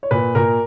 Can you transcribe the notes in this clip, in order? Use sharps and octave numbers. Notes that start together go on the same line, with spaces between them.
C#5
A#2 B4
A#2 A#4